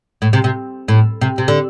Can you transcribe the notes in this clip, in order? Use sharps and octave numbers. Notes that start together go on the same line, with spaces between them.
A2
C3
C3
A2
C3
C3
D3